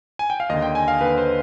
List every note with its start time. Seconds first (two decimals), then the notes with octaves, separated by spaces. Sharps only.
0.19 G#5
0.30 G5
0.40 F5
0.50 D#2 D3 D#5
0.62 G5
0.75 G#5
0.88 F5
1.00 D#2 D3 B4
1.18 C5